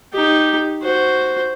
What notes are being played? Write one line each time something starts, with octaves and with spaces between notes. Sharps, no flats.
D#4 G4
F#4 C5